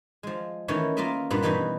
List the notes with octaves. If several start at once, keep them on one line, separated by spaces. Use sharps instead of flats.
F3 G#3
D#3 E3 A3 C#4 E4 C#5
A#3 F4 A#4 D#5 E5
G2 A#2 B3 B4
B2 E3 G3 D#4 F#4 B4